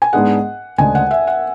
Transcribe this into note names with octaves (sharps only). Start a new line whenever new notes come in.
G#5
G#2 G#3 B3 D4 G#4 F#5
D2 C#3 G#3 D4 G#5
F#5
E5
F#5